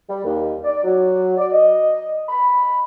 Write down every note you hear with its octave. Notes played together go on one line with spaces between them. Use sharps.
G3
D#2
D5
F#3
D5
D#5
B5